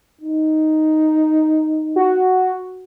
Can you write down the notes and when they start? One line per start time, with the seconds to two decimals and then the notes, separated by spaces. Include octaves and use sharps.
0.21 D#4
1.96 F#4